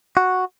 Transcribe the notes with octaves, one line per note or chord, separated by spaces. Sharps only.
F#4